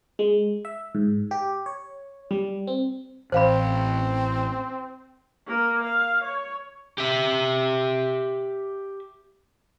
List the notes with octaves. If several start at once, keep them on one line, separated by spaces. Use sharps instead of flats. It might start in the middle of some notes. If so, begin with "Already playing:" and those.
G#3
E5
G#2
G4
C#5
G3
C4
A1 C4 C5 F5 B5
A#3 A#4
F5
C#5
G4 E5